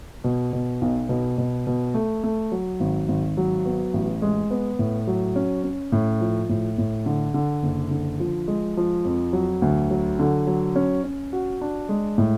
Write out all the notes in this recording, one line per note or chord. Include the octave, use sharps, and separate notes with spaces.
B2
B2
B1
B2
B2
B2
A3
A3
F#3
G#1
G#1
F#3
B3
A1
G#3
B3
A2
F#3
C#4
C#4
A2
F3
A2
A2
D3
D3
F#1
D3
F3
G#3
F3
F2
F#3
D2
F#3
D3
F#3
C#4
C#4
F#4
D4
G#3
A2